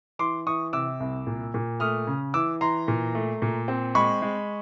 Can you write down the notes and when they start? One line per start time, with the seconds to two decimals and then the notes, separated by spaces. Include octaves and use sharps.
0.19 E3 C6 D6
0.46 E3 C#6 D#6
0.73 C3 D6 E6
1.00 C2
1.27 A#2
1.54 A#2
1.80 A3 D#6 F6
2.07 C#3
2.34 E3 D6 E6
2.61 E3 A#5 C6
2.88 A#2
3.15 A3
3.42 A#2
3.68 C4
3.95 G#3 B5 C#6
4.22 G#3